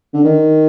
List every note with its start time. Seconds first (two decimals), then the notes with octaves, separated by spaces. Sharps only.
0.14 D3
0.24 D#3